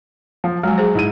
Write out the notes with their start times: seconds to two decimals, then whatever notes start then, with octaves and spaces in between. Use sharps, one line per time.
0.44 F3
0.63 F#3 G#3 G#5
0.78 G#4 C5
0.95 G#2 E4 D#7